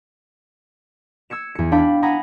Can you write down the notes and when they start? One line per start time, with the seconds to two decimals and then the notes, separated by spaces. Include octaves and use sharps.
1.30 E6 G#6 C#7 E7
1.55 E2 C#7
1.72 D4 F5 G5 B5
2.02 F#5 G#5 A#5 B5 D#6 A#6